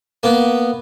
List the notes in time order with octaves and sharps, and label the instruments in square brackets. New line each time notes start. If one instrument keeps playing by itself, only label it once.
[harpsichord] A#3 B3